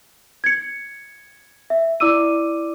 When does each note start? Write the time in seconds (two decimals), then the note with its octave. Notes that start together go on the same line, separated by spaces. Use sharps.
0.44 G#6 C#7
1.70 E5
2.00 E4 D5 D6 E6 D#7